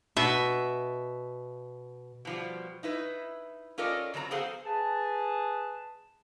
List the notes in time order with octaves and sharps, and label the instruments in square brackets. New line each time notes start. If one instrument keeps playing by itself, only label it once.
[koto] B2 E5
[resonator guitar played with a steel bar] B2 F3 G3
D#4 E4 B4
C#4 F4 A4 A#4 D5 D#5
C#3 F#3 C4 A#5
B3 G#4 A4 C5 F5
[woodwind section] G#4 B4 A5